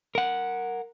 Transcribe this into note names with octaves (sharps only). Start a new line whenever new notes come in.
A#4 F#5